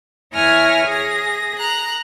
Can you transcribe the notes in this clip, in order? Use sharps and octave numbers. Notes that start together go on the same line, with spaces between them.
E2 E4 C#5 G#5 F6 A#6
G#4 A#6
A#5 F#6